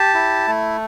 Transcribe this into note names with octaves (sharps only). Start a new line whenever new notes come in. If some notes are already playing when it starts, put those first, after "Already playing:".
Already playing: G4 A5
E4
A3